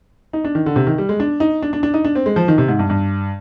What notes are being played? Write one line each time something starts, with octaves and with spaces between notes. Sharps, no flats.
D#4
D4
D#3
D3
C3
D#3
G3
G#3
D4
D#4
D4
D4
D4
D#4
D4
C4
G#3
F3
D#3
C3
G#2
G2
G2